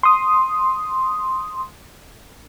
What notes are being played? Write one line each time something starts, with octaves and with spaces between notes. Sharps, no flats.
C6 D#6